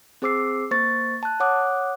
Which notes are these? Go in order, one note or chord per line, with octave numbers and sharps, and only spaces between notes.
C4 G#4 C5 D6 E6 C7
A#3 C5 C#6 A6
A5 F#6
C#5 F#5 D6 D#6 F#6